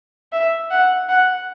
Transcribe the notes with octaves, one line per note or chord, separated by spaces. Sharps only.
E5
F#5
F#5